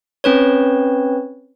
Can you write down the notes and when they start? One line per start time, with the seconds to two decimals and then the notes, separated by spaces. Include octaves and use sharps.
0.24 C4 C#4 B4 C#5